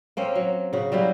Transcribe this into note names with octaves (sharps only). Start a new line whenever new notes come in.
A#3 C4 C#4
F#3
C#3 F#4
F#3 G3 A#3 E4